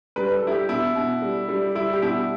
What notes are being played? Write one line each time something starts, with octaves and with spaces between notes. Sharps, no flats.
G3 B4
A4
G3 E4
G4
B2 E4
B2
G3
G3
G3 E4
G4
B2 E4